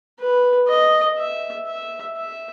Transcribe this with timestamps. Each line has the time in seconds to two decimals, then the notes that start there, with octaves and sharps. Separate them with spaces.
0.20 B4
0.68 D#5
1.17 E5
1.67 E5
2.16 E5